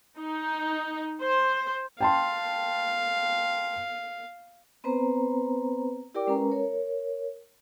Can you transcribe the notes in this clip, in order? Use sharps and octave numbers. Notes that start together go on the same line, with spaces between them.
D#4
C5
F5 G5 A5 C6
B3 C4 B4 C5 A#5
E4 G4 A#4 D5 G5 D6
G#3 C#4 A#4 B4 A#5
A#4 C#5